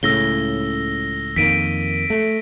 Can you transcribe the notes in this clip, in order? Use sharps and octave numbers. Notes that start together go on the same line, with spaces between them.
C#2 A2 C#3 E6 A#6 G7
F2 D#3 A#3 B6 D7 D#7
A3